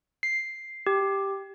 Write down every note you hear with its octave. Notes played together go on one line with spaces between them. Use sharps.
C7
G4